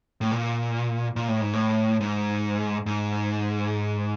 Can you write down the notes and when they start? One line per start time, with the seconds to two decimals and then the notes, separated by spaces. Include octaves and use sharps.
0.21 A2
0.31 A#2
1.16 A#2
1.28 A2
1.41 G#2
1.53 A2
2.01 G#2
2.86 G#2